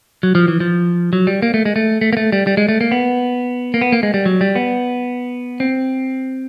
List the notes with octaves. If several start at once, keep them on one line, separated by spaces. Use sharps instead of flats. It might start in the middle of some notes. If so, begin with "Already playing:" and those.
F#3
F3
E3
F3
F#3
G3
A#3
A3
G#3
A3
A3
A#3
A3
G3
G3
G#3
A3
A#3
B3
A#3
B3
A#3
G#3
G3
F#3
G3
B3
C4